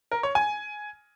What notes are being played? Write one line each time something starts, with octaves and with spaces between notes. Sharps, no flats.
A#4
C#5
G#5